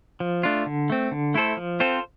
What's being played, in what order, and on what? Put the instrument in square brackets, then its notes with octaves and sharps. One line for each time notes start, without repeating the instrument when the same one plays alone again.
[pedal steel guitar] F3
A3 D4 F4
D3
A3 C4
D3
A3 E4 A4 C5
F3
C4 F4 A4 C5